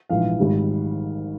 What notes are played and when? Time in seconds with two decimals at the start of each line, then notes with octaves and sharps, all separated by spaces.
0.09 A#1 G#2 E3 F5
0.39 G#1 G#2 G3